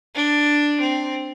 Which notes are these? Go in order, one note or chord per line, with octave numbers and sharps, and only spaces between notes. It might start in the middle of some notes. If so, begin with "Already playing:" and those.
D4
C4